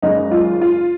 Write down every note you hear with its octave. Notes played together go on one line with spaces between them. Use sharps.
G#1 F#2 C#3 G#3 D#4
F4
F4